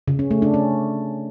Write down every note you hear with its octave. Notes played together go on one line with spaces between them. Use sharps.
C#3
C#4
A3
D4
C#4